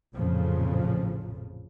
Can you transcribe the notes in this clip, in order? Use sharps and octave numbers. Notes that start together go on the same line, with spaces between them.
A1 F2 A#2 C#3 F3